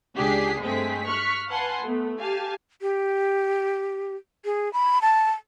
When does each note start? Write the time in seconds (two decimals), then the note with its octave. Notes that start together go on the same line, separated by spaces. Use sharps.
0.15 C#2 D4 G4 G#4 B6 C7
0.61 G2 G#3 A3 C4 G#4 B6
1.07 C#6 F6 F#6 B6
1.48 B4 F5 F#5 G#5 A5 C6
1.84 A3 B3
2.19 G4 F5 G#5 A5
2.82 G4
4.45 G#4
4.73 B5
5.02 A5